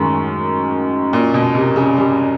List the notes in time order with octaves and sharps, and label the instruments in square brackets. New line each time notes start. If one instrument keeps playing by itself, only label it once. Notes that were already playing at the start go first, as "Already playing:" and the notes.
Already playing: [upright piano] F#2 D#3 G#3 [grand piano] A2
[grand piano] A#2
B2
C3
C#3
G3